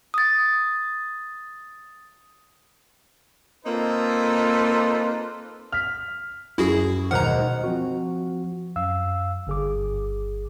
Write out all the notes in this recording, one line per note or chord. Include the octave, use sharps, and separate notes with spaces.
D#6 A6
A#3 C4 D#4 F4 A4 B4
F6 B6
F#2 E4 F#4 G#4
D#2 B2 G#3 C5 F#5 A#5 F6 F#6
F3 C4 F#4
F#2 F5 E6
G1 G#4 D6